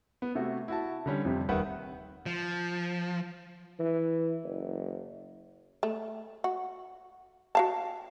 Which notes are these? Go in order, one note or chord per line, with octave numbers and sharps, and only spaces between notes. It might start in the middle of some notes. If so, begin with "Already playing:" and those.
B3
C3 A3 F#4
E4 F#4 A5
D3 G3 C#4
F2 C3 G3
D#1 D#3 B4 E5 F#5
F3
E3
F#1
A3
F#4
F#4 F5 A5